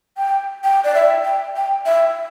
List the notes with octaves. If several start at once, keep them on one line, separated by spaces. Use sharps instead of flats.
G5
G5
D5
E5
G5
G5
E5